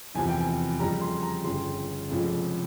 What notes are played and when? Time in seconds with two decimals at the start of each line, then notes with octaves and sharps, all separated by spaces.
0.15 F1 E2 C3 F3 G#5
0.29 G5
0.41 G#5
0.80 F2 C#3 G3 A#5
1.01 C6
1.23 A#5
1.44 G1 F2 C#3 C6
2.10 F1 F2 C#3 F3 G#3